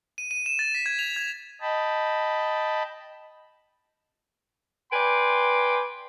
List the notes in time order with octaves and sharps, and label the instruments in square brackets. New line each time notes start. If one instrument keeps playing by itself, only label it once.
[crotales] D#7
D#7
E7
A6
B6
G#6
F7
G#6
[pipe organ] D#5 G5 A5 B5
[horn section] B4 D5 G5 G#5 C6